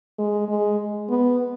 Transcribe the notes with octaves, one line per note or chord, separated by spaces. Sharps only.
G#3
G#3
B3